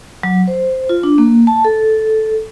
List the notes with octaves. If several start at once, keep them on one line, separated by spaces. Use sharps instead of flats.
F#3
C5
F4
D4
A#3
A5
A4